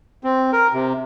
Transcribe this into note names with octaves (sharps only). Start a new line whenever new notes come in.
C4
A#4
C3